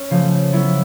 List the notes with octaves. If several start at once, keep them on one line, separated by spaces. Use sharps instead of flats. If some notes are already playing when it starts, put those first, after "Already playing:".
Already playing: C#4
C#3 F3 A3
F#3 B3 E4